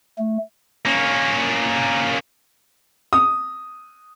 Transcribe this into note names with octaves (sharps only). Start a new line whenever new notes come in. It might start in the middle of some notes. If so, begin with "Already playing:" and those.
A3
A#3 C#4
D#6